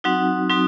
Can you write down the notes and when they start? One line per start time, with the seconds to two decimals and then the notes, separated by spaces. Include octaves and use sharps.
0.04 F#3 C4 D#4 F#4 F#5
0.49 F#3 C4 D#4 F#4